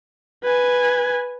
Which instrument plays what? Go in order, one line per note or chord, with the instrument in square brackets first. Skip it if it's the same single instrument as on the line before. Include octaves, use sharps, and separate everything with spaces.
[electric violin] B4 G#5